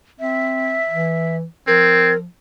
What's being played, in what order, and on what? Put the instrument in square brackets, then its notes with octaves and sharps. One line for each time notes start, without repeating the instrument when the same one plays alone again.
[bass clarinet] C4 [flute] E5
[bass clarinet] E3
[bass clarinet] F3 [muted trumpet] C4 [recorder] A#4 [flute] G#6